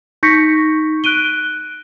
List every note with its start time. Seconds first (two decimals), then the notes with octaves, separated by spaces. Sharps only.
0.23 D#4 C#6 G6 A#6 B6 C#7
1.04 F#6 D7 D#7 G7